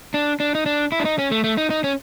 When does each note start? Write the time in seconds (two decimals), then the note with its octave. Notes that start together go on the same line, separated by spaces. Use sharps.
0.14 D4
0.40 D4
0.55 D#4
0.66 D4
0.92 E4
1.00 D4
1.05 D#4
1.19 C#4
1.31 A3
1.44 A3
1.57 D#4
1.70 D#4
1.84 C#4